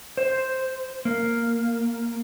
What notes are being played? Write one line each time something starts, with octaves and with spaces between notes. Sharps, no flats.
C5
A#3